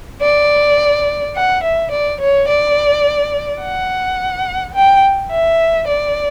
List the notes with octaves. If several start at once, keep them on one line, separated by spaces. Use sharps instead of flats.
D5
F#5
E5
D5
C#5
D5
F#5
G5
E5
D5